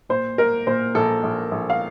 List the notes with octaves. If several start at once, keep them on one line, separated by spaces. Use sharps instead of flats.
A#2 C5
A#3 A#4
A#2 C5
A#1 A4
A#1
A#1
F5